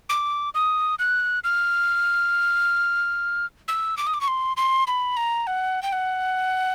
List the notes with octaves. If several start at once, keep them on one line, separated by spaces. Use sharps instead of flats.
D6
D#6
F#6
F6
E6
D6
D#6
D6
C#6
C6
C6
B5
A#5
F#5
G5
F#5